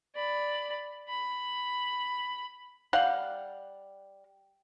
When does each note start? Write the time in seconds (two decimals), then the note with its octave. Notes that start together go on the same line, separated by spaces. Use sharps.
0.15 D5 B5
1.09 B5
2.93 G3 F5 F#5